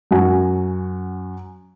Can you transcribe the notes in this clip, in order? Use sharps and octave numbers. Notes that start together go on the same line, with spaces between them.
F#2 C#4 F#4 F#5 G#5